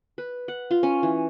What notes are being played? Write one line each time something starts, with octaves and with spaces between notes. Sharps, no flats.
B4
F#5
F4
C#4
E3